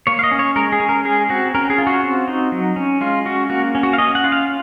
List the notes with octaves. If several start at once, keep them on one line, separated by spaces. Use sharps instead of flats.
A#3 C#5
F5
D#5
C#4
C#5
G#3 A#4
G#4
C#4
A#4
G#3 G#4
C4 F#4
C#4 A#4
G#4
F4
F#4
C4
D#4
F#3
C#4
G#3 F4
C#4 F#4
A#3 F#4
C#4
F#4
F5
C#4 D#5
F#5
F4
F5